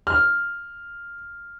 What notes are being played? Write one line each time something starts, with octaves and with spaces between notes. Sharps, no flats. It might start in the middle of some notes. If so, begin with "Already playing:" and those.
F6